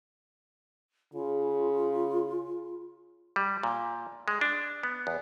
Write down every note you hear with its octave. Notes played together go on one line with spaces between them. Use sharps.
C#3 F4
G3
A#2
G#3
D4
B3
E2